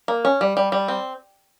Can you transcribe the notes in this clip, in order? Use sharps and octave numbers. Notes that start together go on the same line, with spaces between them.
A#3
C#4
G3
G3
G3
C4